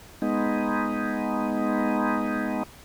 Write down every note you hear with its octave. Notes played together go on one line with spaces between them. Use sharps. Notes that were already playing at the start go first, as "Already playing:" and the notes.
G#3 B3 D#4